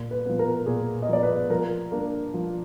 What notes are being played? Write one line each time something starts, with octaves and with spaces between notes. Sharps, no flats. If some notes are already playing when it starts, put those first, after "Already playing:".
Already playing: A#2
B4
F3 B3
A#4
A#2 G#4
D#5
F3 B3 D5
B4
F3 A#4
A#3 D4
F3